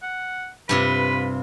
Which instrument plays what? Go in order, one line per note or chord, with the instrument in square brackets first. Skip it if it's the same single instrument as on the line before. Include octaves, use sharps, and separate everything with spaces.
[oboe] F#5
[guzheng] G2 C3 F4 [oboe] B4